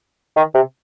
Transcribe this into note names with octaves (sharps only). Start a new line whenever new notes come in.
D#3
C3